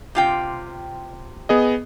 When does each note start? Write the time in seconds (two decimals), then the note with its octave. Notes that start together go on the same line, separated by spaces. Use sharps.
0.15 C3 F4 G5
1.49 B3 G#4 D#5